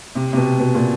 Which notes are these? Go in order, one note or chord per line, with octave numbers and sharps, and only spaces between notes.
C3
C3
B2
B2
A#2